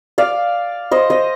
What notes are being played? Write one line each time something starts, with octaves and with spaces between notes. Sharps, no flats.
D5 F5
C5 D#5
C5 D#5